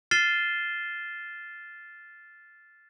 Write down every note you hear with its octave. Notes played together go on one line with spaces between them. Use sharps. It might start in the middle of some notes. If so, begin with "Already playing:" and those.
F6 A6 C7 D#7 E7 G7